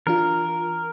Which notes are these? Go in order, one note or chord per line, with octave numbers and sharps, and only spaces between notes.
E3 D4 F4 A#4